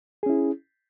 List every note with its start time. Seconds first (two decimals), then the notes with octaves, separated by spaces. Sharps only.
0.23 G#4
0.26 C#4
0.30 E4